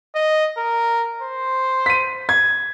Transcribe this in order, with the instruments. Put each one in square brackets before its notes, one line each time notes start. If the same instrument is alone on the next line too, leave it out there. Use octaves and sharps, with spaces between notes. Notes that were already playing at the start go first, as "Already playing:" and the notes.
[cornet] D#5
A#4
C5
[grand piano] B6 D#7
G#6